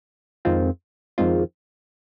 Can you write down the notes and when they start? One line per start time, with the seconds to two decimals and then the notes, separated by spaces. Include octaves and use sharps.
0.45 F2 D#3 G#3 C4 F4
1.18 F2 D#3 G#3 C4 F4